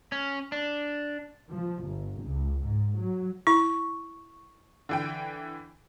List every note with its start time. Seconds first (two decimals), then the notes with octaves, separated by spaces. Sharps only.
0.12 C#4
0.52 D4
1.50 F3
1.84 G1
2.22 C#2
2.62 G#2
2.96 F#3
3.47 E4 C#6
4.89 D3 E3 G5